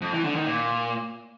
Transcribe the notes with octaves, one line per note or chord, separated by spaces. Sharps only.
F2
E3
D3
D#3
A#2